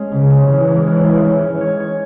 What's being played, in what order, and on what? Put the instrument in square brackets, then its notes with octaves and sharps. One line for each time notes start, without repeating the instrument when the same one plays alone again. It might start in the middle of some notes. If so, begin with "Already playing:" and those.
Already playing: [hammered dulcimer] G#3 C#4
[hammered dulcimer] G#2 [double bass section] C#3
[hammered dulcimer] G#3
[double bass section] E3 [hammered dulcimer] C#4
[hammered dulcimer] G#2
C#4
G#2
C#4
C#5
C#5
C#5